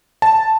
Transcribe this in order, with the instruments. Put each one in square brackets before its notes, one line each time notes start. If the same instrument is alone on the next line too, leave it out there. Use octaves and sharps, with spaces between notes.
[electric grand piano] A5